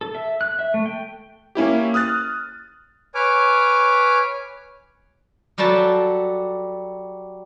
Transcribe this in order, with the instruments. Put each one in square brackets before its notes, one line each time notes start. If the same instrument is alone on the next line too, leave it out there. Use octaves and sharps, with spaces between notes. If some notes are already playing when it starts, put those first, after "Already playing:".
[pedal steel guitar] A4
E5
F#6
E5
A3
G5
[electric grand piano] A#3 C#4 E4 G4
D#6 F6 F#6 A6
[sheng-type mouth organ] B4 C#5 G#5 D6 F6
[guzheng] F#3 G3 F#4 A4 A5